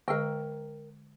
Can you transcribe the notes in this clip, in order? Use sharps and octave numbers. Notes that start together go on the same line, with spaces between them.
D3 G#3 A#4 D#5 G5